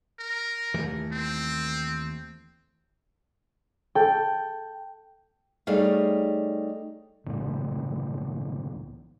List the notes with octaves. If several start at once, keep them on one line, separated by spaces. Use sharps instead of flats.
A#4
D#2 E3 A3
C4
A4 G5
G3 A3 D#4 G#4 C#5 F5
C2 A2 C#3 E3